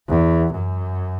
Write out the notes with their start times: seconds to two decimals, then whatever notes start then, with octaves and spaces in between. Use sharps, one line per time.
0.08 E2
0.54 F#2